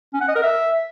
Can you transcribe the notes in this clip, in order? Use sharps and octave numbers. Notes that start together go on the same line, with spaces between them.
C#4
F#5
D#5
A#4
E5